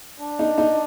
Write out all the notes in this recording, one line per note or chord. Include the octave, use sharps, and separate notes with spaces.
D4
D#4
D#4